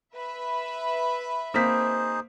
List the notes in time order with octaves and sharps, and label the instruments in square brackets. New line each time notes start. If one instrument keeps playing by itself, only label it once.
[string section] B4 E5 B5
[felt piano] A#3 C4 B6 [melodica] D#4 G#4 C5